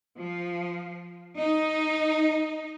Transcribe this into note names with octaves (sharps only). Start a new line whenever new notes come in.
F3
D#4